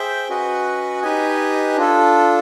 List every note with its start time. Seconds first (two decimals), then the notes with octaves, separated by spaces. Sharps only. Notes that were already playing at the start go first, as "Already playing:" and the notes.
Already playing: G#4 C5 E5 G5
0.29 C#4 F#4 B4 D#5 F#5
1.02 D#4 G4 B4 D#5 G#5
1.76 D4 F4 A4